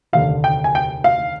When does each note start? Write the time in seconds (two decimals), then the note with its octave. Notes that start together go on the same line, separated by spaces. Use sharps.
0.13 F1 D#2 D3 F5
0.44 G5
0.64 G#5
0.75 G5
1.04 F5